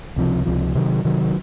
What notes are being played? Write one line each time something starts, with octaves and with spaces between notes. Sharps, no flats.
C#2 C3 F3
C#2 C3 F3
C3 D#3 F#3
C3 D#3 F#3